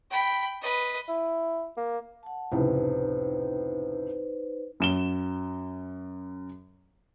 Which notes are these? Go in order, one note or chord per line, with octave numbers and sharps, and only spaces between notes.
G5 B5
B4 D#5
E4
A#3
F#5 A5
F1 C#2 A2 D#4 B4 C5
F#2 E7 G7